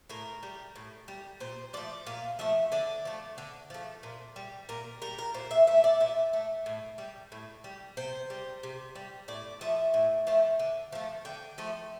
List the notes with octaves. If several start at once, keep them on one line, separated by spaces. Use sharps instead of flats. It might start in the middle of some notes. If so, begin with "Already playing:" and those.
A2 A#4
G3
A2
G3
A#2 C5
F3 A3 D5
A#2 F5
F3 A3 E5
D3 D5
F3 A3
D3
F3 A3
A#2
G3
A#2 A#4
G3 A#4
A#4
A#2 C5
E5
A3 E5
D5
A#2 E5
A3
A2
G3
A2
G3
C3 C5
G3
C3
G3
A2 D5
F3 A3 E5
A2
F3 A3
D3
F3 A3
D3 G5
F3 A3